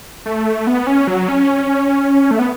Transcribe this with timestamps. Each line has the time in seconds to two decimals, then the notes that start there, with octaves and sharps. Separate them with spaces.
0.25 A3
0.67 B3
0.87 C#4
1.07 F#3
1.28 C#4
2.31 A3
2.39 B3